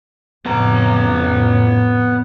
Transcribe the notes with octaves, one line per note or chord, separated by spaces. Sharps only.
F2 A2 C#3 B3 A#5